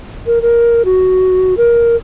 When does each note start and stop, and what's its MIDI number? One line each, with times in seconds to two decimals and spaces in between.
0.27 0.42 70
0.42 0.82 70
0.85 1.54 66
1.57 1.96 70